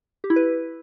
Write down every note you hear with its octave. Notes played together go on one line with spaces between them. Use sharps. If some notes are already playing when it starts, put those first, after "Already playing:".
G4
E4
B4